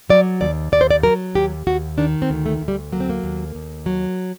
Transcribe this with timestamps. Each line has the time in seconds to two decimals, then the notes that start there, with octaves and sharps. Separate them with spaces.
0.10 F#3 D5
0.41 D#2 D5
0.72 D#2 D5
0.81 C5
0.91 D5
1.03 F#3 A#4
1.35 D#2 G4
1.67 D#2 F#4
1.98 D#3 D4
2.22 C4
2.30 D2
2.46 A3
2.61 D2
2.68 G3
2.92 F#3 A#3
3.00 C4
3.10 A#3
3.24 D#2
3.55 D#2
3.86 F#3